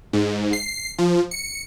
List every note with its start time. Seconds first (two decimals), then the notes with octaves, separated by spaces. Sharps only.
0.13 G#2
0.53 C7
0.98 F3
1.31 C#7